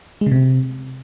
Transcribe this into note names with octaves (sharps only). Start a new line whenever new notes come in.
G#3
C#3
C3